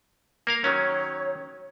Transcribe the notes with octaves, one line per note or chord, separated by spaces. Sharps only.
A#3 A#4 F5
D#3 F#3 C#4 C#5